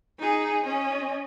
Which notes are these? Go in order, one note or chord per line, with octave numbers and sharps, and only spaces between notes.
D#4 G#4
C#4 D#5